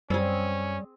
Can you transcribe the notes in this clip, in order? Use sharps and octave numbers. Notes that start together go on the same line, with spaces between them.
F#2 G3 C4 C#4 G#4